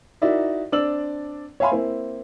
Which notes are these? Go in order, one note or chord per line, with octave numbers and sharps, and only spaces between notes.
D#4 E4 F#4 A#4 D5 E5
C4 D4 D5 E6 F#7
C#5 E5 F5 G#5 B5 C6
A#3 C4 E4